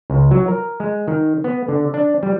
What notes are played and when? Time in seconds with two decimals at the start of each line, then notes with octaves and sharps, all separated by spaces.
0.10 C#2
0.31 F#3
0.48 A#4
0.80 G#3
1.08 D#3
1.44 B3
1.68 D3
1.94 D4
2.23 G3